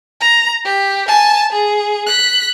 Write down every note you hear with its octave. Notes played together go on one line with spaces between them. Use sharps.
A#5
G4
G#5 A5
G#4
F#6 B6